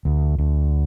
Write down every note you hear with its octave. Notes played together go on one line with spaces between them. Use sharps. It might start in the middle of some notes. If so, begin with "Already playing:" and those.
D2
D2